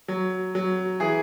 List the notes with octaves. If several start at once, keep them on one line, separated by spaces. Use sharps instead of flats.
F#3
F#3
E3 G#4